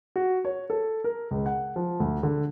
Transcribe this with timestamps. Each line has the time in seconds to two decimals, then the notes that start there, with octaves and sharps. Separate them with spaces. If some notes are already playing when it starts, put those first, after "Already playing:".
0.16 F#4
0.45 C#5
0.70 A4
1.04 A#4
1.31 C#2
1.46 F#5
1.76 F3
2.00 D2
2.23 D3